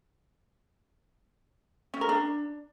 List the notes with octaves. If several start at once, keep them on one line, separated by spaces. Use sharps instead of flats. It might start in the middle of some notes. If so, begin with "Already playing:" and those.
C#4
A#4
D4